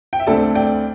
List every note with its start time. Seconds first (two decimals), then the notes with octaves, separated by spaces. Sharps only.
0.13 G5
0.20 E5
0.27 D2 D3 A3 C4 A4 D5
0.55 D5 G5